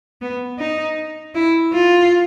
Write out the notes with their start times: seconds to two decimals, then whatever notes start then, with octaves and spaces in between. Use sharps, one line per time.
0.22 B3
0.59 D#4
1.35 E4
1.73 F4